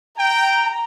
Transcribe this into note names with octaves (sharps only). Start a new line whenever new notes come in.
G5 A#5